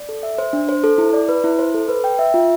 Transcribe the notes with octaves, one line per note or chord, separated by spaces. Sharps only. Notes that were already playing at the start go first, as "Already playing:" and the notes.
Already playing: D5
A4
E5
C5
D4
C5
A4
E4
D5
B4
E4
C5
A4
B4
G5
E5
F4